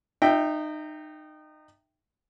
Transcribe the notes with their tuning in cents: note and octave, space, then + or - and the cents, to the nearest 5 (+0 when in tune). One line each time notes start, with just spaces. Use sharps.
D#4 -25 E5 +0 G5 +0